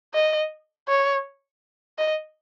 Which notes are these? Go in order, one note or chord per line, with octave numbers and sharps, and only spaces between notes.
D#5
C#5
D#5